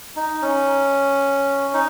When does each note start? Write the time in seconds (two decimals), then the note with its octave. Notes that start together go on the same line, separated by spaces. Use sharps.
0.16 D#4
0.42 C#4
1.74 D#4